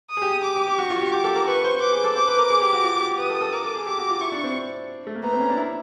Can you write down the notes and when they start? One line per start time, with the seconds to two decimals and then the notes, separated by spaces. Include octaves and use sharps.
0.10 D#6
0.17 G#4
0.22 G4
0.44 D6
0.56 G4
0.67 G4
0.78 F#4 C#6
0.90 F4
0.96 F#4
1.01 G4
1.12 G4 D6
1.24 A4
1.35 A#4
1.47 B4 C#6
1.64 C5
1.81 B4 D6
1.92 G#4
2.04 A4
2.15 C5 D6
2.27 B4
2.38 A#4
2.50 G#4
2.61 G4
2.73 F#4
2.84 F4
2.96 F#4
3.01 G4
3.18 B4 D#6
3.30 A4
3.41 A4
3.53 A#4 D6
3.64 A4
3.75 G#4
3.87 G4 D6
3.98 F#4
4.10 F4
4.21 E4 C#6
4.32 D4
4.44 C4
5.07 A3
5.15 A#3
5.23 B3 A#5
5.32 C4
5.41 C#4
5.49 D4
5.57 E4